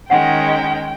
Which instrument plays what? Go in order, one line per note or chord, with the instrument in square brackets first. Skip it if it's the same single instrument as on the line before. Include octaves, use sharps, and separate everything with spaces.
[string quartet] D#3 G#3 C#4 [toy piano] F#5 [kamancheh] G5